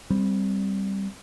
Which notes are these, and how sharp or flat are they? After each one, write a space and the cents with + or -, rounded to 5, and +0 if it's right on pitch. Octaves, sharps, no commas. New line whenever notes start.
G3 +0 C4 +0